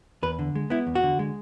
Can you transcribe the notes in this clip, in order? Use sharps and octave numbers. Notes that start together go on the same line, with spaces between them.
E2 B4
D3
G#3
B3 E4
E2
F#4
D3
G#3